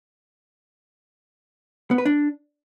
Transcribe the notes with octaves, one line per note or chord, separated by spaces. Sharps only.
B3
B4
D4